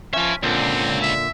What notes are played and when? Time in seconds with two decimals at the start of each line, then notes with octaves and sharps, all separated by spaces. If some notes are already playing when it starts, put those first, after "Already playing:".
0.13 F3 C#4 E5 G#5
0.43 C#2 A#2 D3 C4
1.02 E5